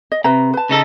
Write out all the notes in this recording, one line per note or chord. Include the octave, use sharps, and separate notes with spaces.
D#5
C3 B4 E5 A#5
B4 A5
C#3 D#4 A4